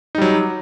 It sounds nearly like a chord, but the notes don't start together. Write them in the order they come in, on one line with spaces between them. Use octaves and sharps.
D#4 G3 F#3